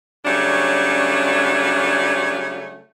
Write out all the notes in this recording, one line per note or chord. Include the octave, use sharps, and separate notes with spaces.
C#3 F#3 G3 A3 C#4 D4